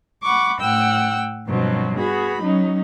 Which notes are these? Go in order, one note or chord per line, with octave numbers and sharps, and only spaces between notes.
F#5 B5 C#6 D6
A2 F#5 G5 E6
G2 B2 F3 F#3 C4
B3 F#4 G#4 B5
F#3 C#4 D#4